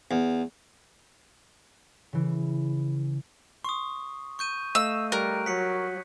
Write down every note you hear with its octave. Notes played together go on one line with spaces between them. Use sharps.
E2
C#3 E3
C6 C#6 D#6
C#6 G6 D#7
A3 D#5 F5 E6
G3 A#4 F#6
F#3 F#6 B6 C#7